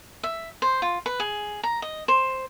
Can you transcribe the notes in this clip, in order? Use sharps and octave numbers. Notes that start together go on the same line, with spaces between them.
E5
C5
F4
B4
G#4
A#5
D#5
C5